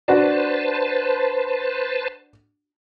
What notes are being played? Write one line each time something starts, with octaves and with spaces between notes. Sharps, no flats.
D4 F#4 B4 C5 A5